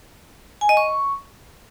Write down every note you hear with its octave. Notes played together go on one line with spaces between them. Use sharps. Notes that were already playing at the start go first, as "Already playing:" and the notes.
G#5
D#5
C#6